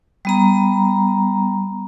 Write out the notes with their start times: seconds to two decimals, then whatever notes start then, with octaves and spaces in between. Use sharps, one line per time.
0.25 G3 B3 A#5